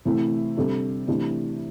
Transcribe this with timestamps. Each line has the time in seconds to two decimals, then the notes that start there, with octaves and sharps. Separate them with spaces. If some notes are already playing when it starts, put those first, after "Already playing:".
0.05 C3 E3 A3 E4
0.57 C3 G3 D4 A4
1.08 C3 E3 A3 D4 G4